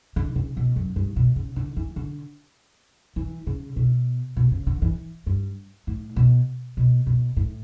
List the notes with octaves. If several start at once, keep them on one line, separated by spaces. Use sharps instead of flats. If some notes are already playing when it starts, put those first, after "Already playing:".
D3
C#3
B2
F#2
G2
B2
C#3
D3
E3
D3
E3
C#3
B2
B2
C#3
D3
E3
G2
A2
B2
B2
B2
A2